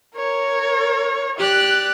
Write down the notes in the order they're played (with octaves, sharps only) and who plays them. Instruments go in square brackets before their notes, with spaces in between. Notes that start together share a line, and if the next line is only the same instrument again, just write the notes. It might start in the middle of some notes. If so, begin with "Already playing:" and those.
[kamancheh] A#4 C#5
[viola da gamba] G4 D5 [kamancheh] F#6